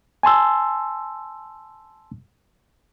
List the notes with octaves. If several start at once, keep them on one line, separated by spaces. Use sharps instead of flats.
G#5 A5 C6 E6